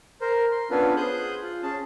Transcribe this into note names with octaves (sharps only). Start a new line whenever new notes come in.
A#4 C5
C6
B3 C#4 D4 F4 A4 B4
G#4 C5 D#6 F#6 G6
F4
C#4 G#4 A5